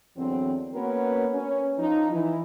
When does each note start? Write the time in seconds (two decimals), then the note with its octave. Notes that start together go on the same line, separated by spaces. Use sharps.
0.17 E2 D3 F#3 C4
0.74 A#3 B3 C#4 F#4 A#4 B4
1.33 C#4
1.79 F3 D#4
2.11 E3 E4